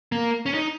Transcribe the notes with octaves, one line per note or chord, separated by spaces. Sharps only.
A#3
C#4
D#4